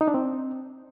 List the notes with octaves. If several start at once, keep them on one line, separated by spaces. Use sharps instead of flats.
D#4
D4
C4